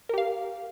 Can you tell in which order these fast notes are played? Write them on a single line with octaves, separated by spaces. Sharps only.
A#4 G4 F5